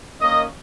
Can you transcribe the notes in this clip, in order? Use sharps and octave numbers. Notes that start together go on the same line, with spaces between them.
D#3 A#3 C#4 D#5